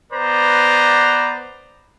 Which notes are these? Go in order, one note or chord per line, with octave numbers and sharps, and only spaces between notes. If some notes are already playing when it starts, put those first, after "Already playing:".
B3 B4 C5 D5 A#5